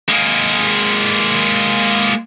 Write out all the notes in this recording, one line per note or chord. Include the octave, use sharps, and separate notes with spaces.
G#3 A#3